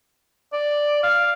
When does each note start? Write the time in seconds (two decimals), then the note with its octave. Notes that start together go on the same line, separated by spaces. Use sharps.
0.53 D5
1.03 F5